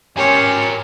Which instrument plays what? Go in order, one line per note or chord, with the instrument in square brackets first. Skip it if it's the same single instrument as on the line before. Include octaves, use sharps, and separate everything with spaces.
[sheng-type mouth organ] C#4 G4 C6 [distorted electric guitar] A#4 G#5 [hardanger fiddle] C#5